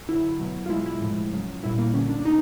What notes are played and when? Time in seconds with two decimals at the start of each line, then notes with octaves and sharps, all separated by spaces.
0.08 D3 F#3 E4
0.40 B2 F#3
0.66 F4
0.70 B2 G#3 E4
0.86 E4
1.01 A2 F3 G#3
1.33 C#3 F#3
1.63 A#2 G3 E4
1.78 A#3
1.94 D3 F#3 C#4
2.10 D4
2.25 B2 D#4